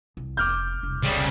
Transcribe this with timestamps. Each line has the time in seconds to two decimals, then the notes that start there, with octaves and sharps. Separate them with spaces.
0.17 C2
0.37 F1 D6 F6 G6
0.83 E1 C2
1.03 C#3 G3